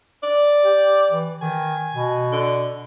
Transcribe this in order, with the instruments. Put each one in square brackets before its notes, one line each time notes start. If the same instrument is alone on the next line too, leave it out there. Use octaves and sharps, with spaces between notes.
[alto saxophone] D5
[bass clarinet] G4
E3
[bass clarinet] D#3 [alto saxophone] G#5
[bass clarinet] B2
[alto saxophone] D3